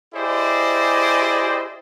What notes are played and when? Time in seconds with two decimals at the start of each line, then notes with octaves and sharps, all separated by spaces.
0.15 E4 G4 G#4 C5 D5 D#5